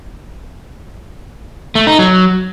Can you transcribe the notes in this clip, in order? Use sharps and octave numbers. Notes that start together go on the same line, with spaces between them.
A3
D#4
F#3